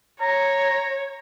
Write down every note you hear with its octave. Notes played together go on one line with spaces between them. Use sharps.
C#5 A#5